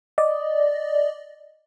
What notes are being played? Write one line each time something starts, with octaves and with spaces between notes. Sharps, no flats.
D5 D#5